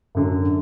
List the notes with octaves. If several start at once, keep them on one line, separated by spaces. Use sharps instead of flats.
F#2 D3 F#3